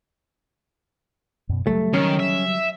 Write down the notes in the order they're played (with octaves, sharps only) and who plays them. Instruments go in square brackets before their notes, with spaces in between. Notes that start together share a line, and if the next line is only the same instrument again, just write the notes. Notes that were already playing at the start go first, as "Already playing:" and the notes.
[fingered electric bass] F#2 B2
[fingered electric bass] C#3 F#3 G3 [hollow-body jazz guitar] A3
[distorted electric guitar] D#3 [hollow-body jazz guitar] C#4
[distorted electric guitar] E5